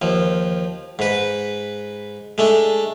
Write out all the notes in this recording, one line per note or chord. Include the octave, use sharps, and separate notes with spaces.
D#2 F3
G#2 B4
G#3 A3 D4